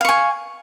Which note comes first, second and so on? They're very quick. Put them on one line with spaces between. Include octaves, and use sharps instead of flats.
F5 C#6 G#5